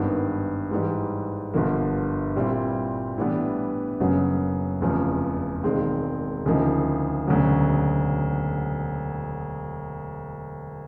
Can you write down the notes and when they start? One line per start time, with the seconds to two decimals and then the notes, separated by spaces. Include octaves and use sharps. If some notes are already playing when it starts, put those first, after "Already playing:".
Already playing: G#1 G2 D#3 G3 B3
0.71 G#2 E3 G3
1.54 G1 G2 D3 F3 A#3
2.36 A#2 G3 C4 E4
3.18 A2 E3 G3 B3 D4
4.00 F#1 F#2 C#3 F#3 B3
4.81 F1 E2 C#3 F3
5.64 E1 D#2 D#3 G#3 C4
6.46 D2 C#3 F3 A#3 D#4
7.27 E1 D2 C#3 F#3